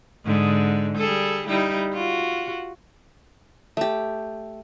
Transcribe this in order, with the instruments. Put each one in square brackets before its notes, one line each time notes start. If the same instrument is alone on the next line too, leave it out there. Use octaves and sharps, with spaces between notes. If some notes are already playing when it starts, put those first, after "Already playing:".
[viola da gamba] G#2 D3
G3 G#4 A4
G3 D#4 E4
F4 F#4
[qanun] A3 G4